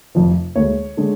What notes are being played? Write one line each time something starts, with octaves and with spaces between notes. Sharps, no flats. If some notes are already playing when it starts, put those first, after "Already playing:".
F1 F2 F3
D2 D3 G#3 C#5
D3 G#3